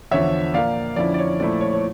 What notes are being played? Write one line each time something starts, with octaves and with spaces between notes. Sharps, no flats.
E2 D3 F3 C#5 E5
A#2 F3 A#3 D5 F5
F2 D3 F3 C#4 E4 D5
D5
C#5
A#2 F3 A3 E4 D5
C#5
C#5